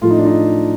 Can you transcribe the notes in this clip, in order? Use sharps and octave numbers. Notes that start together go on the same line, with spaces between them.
A2 F3 A3 F4
D#4
D4
D#4